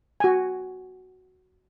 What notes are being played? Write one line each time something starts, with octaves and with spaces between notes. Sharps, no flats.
F#4 G#5